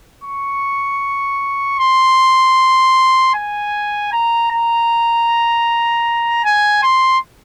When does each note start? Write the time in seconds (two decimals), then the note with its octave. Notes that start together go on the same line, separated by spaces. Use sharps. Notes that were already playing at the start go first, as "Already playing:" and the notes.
0.24 C#6
1.79 C6
3.35 G#5
4.12 A#5
4.51 A#5
6.45 G#5
6.83 C6